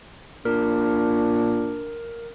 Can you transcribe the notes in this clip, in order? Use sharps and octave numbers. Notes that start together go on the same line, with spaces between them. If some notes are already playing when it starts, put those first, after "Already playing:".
A#2 D4 A#4